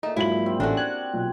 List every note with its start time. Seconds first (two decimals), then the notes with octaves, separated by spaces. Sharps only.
0.03 A#2 A3 D#4 G#4
0.16 G#2 F#3 E4 F4 F#7
0.46 G3 C4 G5
0.60 A1 G3 A3 C#4 D4 F#4
0.77 F#6 G#6
1.14 B1 A#2